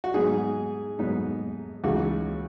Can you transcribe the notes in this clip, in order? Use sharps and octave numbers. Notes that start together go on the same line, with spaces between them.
F#4
G#2 F#3 B3 D#4 G#4
G#2 F#3 B3 D#4
C#2 C#3 E3 G#3 D#4 F#4